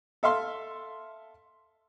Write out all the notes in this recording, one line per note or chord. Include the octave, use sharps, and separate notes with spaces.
A4 E5 F5 C6